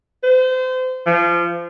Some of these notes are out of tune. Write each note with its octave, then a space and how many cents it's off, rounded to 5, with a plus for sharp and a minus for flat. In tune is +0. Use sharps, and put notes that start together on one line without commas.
C5 -30
F3 -25